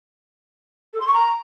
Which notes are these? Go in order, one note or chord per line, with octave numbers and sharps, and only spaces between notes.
A4
C6
C#6
A#5